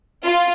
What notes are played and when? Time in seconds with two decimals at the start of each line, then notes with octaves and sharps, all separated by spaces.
0.25 F4